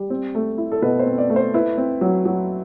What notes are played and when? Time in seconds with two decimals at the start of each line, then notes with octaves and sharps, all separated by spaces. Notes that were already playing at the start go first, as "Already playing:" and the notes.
Already playing: G3
0.10 C4
0.35 A3
0.58 E4
0.72 A4
0.82 B2 B4
0.99 C5
1.06 C4
1.18 D5
1.30 A3
1.36 C5
1.54 E4 B4
1.78 C4
2.01 F#3
2.25 F#3